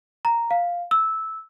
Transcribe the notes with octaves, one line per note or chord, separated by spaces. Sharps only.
A#5
F5
E6